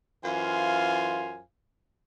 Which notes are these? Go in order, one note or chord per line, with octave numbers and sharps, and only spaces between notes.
F#2 E3 F4 C5 F5 G#5